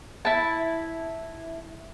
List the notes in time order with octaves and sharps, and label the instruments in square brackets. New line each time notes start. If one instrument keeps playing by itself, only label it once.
[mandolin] E4 A5